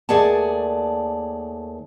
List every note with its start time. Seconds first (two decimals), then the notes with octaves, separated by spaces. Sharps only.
0.09 D#2 A3 G#4 D5 F#5 A5